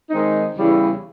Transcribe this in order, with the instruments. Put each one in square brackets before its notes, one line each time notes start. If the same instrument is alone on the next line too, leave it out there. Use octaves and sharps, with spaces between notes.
[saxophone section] D#3 G#3 C4 D#4
E2 C#3 E3 G3